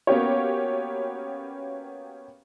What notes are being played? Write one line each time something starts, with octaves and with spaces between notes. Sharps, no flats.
A#3 B3 C#4 F#4 G4 C#5